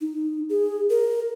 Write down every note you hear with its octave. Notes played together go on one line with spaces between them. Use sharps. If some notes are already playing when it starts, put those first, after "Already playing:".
D#4
G#4
A#4